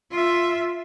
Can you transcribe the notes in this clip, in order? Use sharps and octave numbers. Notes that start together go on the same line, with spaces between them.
F4 E5